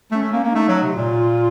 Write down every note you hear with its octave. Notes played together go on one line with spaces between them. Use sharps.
A3 C#4
A3
A#3
A#3
A3 D#4
F#3
C3
A#2 F4